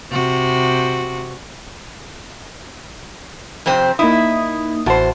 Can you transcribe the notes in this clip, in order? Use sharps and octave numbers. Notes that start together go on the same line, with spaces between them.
C3 F#4
F2 C3 C4
A#3 D#4 E4 D#6
A1 E2 F#4 C5 A5